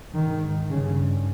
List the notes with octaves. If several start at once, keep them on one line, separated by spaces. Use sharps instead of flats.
G#2 D#3
G2 C#3